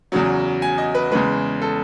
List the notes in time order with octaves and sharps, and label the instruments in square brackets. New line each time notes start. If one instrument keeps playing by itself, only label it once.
[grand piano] E2 C#3 F#3
G#5
D#5
B4
E2 C#3 G#3 B4
A4